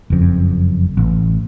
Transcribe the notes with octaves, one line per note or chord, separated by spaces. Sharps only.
F#1 F2
A1